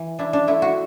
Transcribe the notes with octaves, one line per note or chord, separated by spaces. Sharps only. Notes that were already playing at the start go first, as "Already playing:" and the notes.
Already playing: E3
D4 E4
D4
A3 E4
F#4